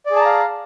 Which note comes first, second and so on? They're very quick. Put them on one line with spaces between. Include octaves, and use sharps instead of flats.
D5 G#4 A5 A#5 F5